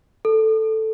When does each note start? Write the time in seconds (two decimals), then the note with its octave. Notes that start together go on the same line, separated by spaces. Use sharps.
0.25 A4